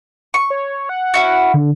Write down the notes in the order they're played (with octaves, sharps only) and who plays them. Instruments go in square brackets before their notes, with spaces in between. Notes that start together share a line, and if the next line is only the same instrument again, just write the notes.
[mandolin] C#6
[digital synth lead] C#5
F#5
[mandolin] C#4 E4 F#4
[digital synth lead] D3